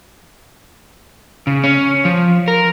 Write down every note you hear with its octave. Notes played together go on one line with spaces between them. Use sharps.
C#3
C#4
F3
A#4